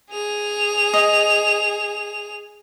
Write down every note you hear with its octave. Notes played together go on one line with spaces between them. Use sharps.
G#4 F7
D#5